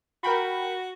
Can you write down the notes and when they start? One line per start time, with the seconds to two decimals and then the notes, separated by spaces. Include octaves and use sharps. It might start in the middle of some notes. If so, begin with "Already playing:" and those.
0.23 F#4 A#4 G5 B5